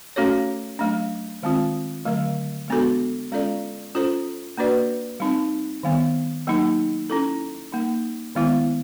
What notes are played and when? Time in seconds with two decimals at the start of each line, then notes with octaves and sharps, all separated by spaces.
0.16 A3 C#4 F#4 A4 C#5
0.79 F#3 A3 D4
1.43 D#3 G#3 C4 F4
2.05 D3 F#3 A3
2.68 G#3 B3 D4 F#4 A4
3.32 G#3 C#4 F4 A4 D5
3.95 C#4 F4 A4 C5
4.58 A#3 D4 F#4 B4 D5
5.20 G3 C4 D#4
5.83 D#3 G3 B3
6.47 F#3 A#3 D#4
7.10 C#4 E4 A4
7.72 G3 A#3 D#4
8.35 D#3 G#3 B3 E4